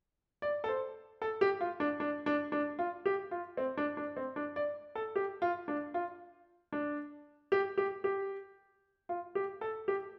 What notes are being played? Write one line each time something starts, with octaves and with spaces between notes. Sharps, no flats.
D5
A4
C5
A4
G4
F4
D4
D4
D4
D4
F4
G4
F4
C4
D4
D4
C4
D4
D5
A4
G4
F4
D4
F4
D4
G4
G4
G4
F4
G4
A4
G4